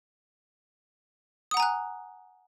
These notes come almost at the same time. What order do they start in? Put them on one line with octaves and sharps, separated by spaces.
D#6 F#5 A#5 G#5 F#6